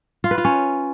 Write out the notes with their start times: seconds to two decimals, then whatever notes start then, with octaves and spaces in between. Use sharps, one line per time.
0.24 F4
0.31 B4
0.38 F4
0.45 C#4